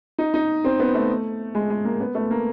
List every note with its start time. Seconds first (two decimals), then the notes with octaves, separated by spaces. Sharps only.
0.19 D#4
0.34 D#4
0.65 C4
0.80 B3
0.94 A3
1.55 G#3
1.70 G#3
1.85 A#3
2.00 B3
2.15 A3
2.31 A#3